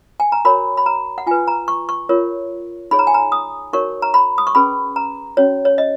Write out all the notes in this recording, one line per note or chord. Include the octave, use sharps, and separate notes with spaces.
G#5
A#5
F#4 A#4 C#5 B5
B5
A#5
F#5
F4 B4 G#5
A#5
C#6
C#6
F4 A#4 C#5
D#4 G#4 C#5 B5
A#5
G#5
A#5
D#6
D#4 F#4 A#4 C#5 C#6
A#5
B5
D#6
C#6
C#4 G#4 B4 B5
A#5
C#4 F#4 C#5
C#5
D#5